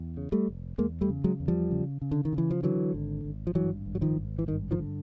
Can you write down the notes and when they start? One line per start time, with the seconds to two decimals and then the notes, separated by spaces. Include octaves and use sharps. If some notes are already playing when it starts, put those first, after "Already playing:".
Already playing: E2
0.17 C#3
0.32 G3 A3
0.48 F1
0.78 E2 G#3 A#3
1.01 G3 A3
1.10 C#3
1.24 F#3 G#3
1.40 E2
1.48 F3 G3
1.71 C#3
2.02 C#3
2.11 D3
2.25 D#3
2.32 C#3
2.38 E3
2.51 F3
2.63 D3 E3 F#3
2.94 G#1
3.25 G#1
3.47 F3
3.55 G2 E3 F#3
3.86 G#1
3.95 F#3
4.01 D#3 F3
4.17 G#1
4.39 E3
4.48 G2 D#3
4.71 D#3 F3
4.79 D3